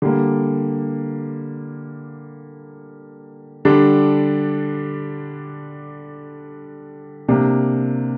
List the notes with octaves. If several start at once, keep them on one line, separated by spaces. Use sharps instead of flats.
D3 G3 A#3
D3 G3 D4
C3 A#3 D4